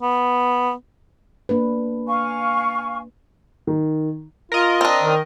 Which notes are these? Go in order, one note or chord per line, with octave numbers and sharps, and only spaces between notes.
B3
A#3 D4 B4
F5 G#5 C#6
D#3
F4 A#4 D#5
C4 D4
D#3